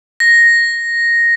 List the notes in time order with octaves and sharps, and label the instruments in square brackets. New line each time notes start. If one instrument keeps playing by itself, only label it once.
[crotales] A#6